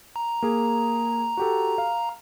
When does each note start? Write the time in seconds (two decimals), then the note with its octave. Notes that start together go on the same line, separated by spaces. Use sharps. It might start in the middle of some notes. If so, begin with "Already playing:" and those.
0.16 A#5
0.42 A#3 G#4
1.37 F#4 G4 A4
1.78 F5